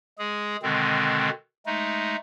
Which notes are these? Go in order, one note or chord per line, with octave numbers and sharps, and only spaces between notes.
G#3 G#4
B2 D3 D#3 G#3 C4
G#3 A3 D#4